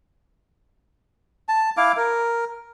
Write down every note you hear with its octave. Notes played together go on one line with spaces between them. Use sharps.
A5
E4 F5 D6
A#4